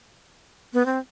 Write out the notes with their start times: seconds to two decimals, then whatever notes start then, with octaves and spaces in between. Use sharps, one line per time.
0.73 B3
0.86 C4